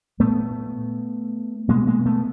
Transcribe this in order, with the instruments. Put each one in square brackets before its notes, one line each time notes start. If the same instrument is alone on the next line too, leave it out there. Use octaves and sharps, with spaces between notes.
[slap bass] A#2 A3 B3
B2 G#3 A#3
G#3 A#3
A3 B3